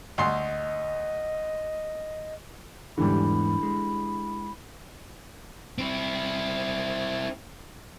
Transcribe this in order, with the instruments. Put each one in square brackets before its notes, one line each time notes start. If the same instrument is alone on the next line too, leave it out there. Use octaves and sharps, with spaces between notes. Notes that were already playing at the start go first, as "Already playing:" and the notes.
[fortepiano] D2 C6 [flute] D#5
[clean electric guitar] E2 G#2 [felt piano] D3 E3 G3 [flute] B5
[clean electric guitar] G#3
[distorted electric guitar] C4 E4